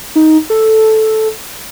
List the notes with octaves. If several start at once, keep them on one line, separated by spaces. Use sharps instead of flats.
D#4
A4